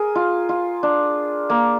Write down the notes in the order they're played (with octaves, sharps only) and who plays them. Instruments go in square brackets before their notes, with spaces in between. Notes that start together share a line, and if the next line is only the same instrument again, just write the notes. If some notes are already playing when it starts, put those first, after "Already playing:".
Already playing: [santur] G#4 A#4
F4
F4
D4
A#3